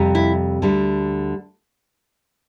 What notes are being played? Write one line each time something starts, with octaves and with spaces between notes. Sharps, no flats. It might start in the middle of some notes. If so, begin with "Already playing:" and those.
Already playing: F2 C3 G3
E4
D2 D3 G3